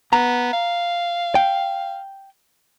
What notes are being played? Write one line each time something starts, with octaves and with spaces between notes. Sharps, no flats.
B3 A#5
F5
G5